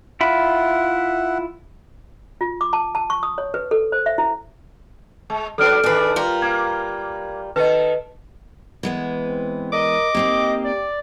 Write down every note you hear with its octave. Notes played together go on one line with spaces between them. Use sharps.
E4 F4 E5 F#5 B5
F4
D6
A5
A5
C#6
D#6
C#5
B4
A4
C5
E5
E4
G#3
F#3 D4 A4 B4 F6 D7
D#3 D4 G#4 B4
G3 F4 A#4
A#3 G#6
D#3 A4 B4 D#5
E3 G#3 B3
C4
A#4 D#5 D6
A#3 C4 D#4 G4
D5